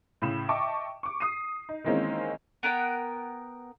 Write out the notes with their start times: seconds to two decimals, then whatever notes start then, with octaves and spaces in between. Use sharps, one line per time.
0.22 A2 C#3 B5 E7
0.49 D#5 E5 G5 A5 C#6 D6
1.03 C#6 D6
1.20 D#6 C7 D#7
1.69 D#4
1.84 D#3 E3 G#3 A#3 C4 C#4
2.63 B3 A#4 F#5 G5